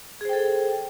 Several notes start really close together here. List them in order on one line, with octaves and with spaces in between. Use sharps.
G#4 C5 G5 A4